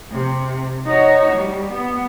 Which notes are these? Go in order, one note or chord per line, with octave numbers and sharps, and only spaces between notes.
C3
D#4 F#4 C#5
G3
B3